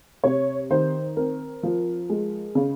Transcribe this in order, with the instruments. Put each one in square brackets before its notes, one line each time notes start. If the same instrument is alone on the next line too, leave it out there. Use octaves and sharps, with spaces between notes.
[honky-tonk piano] C3 C#5
D#3 C5
C4 A#4
F3
G#3
C#3